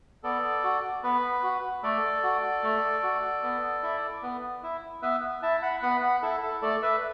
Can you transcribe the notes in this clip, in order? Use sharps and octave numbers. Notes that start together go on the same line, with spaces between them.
B3 A4 D5
F#4
B3 B4
F#4
A3 A4 D5
F#4
A3
F#4
B3
E4
B3
E4
B3 B4 E5
E4 E5 A5
F#5 B5
B3 F#5 B5
F#5 B5
E4 A4
A4
A3 A4 D5
B4 E5